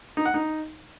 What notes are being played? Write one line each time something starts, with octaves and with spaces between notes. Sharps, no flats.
D#4
F#5
D#4